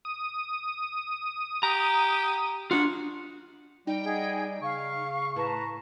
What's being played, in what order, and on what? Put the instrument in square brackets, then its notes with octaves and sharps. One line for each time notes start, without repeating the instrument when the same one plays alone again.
[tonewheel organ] D#6
[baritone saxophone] G4 [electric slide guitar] A#5
[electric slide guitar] D4 F4 [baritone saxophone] F#4
[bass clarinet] G3 [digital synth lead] D#4 [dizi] G5
[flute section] G#4 D#5 F#5
[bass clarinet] C#3 [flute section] F5 [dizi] C#6
[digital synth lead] A2 [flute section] B4 A5 A#5